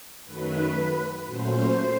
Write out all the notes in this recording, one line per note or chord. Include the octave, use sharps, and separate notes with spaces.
F#2 D#3 F#3 A3 B4
A#2 F#3 A3 C#4 C5